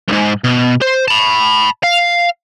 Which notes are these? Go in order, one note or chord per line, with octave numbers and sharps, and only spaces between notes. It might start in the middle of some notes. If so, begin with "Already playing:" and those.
C2 G#2
B2
C5
A5 B5
F5